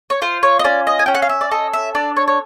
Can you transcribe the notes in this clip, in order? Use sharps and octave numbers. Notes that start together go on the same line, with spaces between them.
C#5
F4 C5
C#5
D#5
C#4 D5
D#5
G#5
C#4 G5
F#5
F5
E5
D5
A4 D#5
E5
D4 D5
C#5
C#5